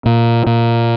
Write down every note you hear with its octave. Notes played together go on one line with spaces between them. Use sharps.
A#2
A#2